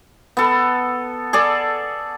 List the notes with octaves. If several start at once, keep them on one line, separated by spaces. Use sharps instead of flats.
B3 A4
G#4 A4 D5